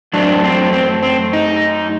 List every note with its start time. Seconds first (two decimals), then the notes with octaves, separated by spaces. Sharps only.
0.13 F#2 F#3 A3 C4 D4
0.44 C4
0.73 C4
1.03 C4
1.33 D#4